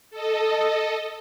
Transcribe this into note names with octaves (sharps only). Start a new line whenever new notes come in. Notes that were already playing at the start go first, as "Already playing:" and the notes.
A4 D#5